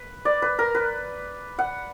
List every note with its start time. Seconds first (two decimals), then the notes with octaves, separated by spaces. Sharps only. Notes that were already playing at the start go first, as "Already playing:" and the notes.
Already playing: B4
0.25 D5
0.42 B4
0.59 A#4
0.75 B4
1.59 F#5